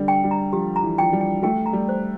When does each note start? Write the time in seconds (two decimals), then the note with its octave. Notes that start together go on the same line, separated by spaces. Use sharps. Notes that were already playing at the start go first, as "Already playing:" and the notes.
Already playing: D3 G3
0.08 G5
0.24 G3
0.31 A#5
0.53 F3 G4
0.76 A#5
0.83 E3
0.98 F3 G5
1.13 G3
1.20 G5
1.43 A3 G5
1.66 A#5
1.73 G3
1.89 C5